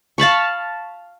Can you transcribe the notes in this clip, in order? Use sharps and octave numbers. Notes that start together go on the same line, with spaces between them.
F5 A5 B5 C#6